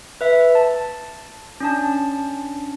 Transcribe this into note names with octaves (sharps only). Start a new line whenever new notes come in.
B4 E5
A5
C#4 D4 A5